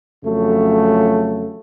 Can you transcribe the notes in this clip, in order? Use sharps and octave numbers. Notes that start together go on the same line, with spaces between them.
F2 C#3 F#3 A3